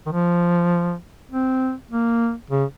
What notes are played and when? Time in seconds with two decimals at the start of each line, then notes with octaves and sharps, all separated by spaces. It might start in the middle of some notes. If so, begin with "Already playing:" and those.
0.06 D#3
0.12 F3
1.32 C4
1.91 A#3
2.50 C#3